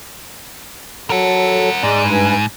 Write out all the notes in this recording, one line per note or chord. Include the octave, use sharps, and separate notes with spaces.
F#3 A4 A#4 F#5
G#2 G#3 D5
G2 B4 G#5